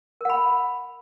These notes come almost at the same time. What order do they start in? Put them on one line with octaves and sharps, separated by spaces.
A#4 F#5 B5